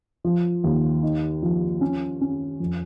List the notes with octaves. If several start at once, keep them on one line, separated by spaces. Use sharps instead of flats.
F3
D#2
D#4
F3
C#4
C#4
F2